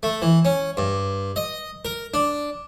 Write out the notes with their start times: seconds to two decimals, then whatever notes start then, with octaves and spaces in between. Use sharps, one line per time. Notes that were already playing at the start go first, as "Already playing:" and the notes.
0.03 A3
0.22 E3
0.45 C#4
0.77 G2
1.36 D#5
1.85 A#4
2.14 D4